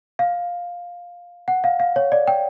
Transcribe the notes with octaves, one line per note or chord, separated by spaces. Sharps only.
F5
F#5
F5
F5
C#5
D5
G5